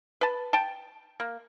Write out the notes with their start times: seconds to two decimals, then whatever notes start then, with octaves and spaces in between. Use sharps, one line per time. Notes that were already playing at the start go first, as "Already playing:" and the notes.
0.21 B4 A5
0.53 G5 A5
1.20 A#3